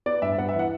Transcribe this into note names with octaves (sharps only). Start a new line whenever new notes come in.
B3 D5
G2 E5
B3 F#5
E5
E3 F#5